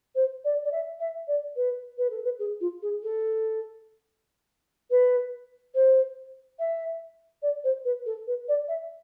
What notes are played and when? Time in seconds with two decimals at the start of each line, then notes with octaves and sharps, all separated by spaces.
0.15 C5
0.45 D5
0.65 D5
0.72 E5
1.00 E5
1.28 D5
1.56 B4
1.98 B4
2.10 A4
2.24 B4
2.39 G#4
2.61 F4
2.82 G#4
3.03 A4
4.91 B4
5.75 C5
6.59 E5
7.42 D5
7.64 C5
7.85 B4
8.06 A4
8.27 B4
8.48 D5
8.68 E5